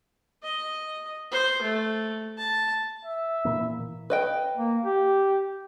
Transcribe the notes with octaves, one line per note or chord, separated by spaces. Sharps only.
D#5
C5
A3
A5
E5
A#2 E3 A#3
B4 D#5 G5
A#3
G4